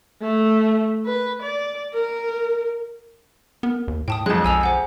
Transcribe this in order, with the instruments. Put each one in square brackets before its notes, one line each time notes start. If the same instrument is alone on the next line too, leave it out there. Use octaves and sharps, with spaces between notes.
[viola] A3
B4
D5
A#4
[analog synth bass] B3 [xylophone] A#4
[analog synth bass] D#2
[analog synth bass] A2 [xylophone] G5 A5 D#6
[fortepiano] F2 G#3 [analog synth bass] F#3 [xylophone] A5 F#6
[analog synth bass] B1 [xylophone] G#5 E6 F7
[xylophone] C5 F#5 G#5